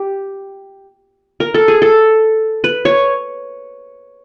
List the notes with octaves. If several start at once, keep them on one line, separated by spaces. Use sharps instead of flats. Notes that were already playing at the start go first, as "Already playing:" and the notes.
Already playing: G4
A#4
A4
G#4
A4
B4
C#5